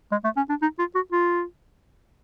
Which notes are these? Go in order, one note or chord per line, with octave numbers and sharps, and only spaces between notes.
G#3
A3
C#4
D4
D#4
F4
F#4
F4